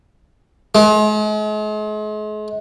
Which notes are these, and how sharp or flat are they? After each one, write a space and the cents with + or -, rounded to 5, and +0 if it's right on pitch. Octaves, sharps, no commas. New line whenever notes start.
G#3 +40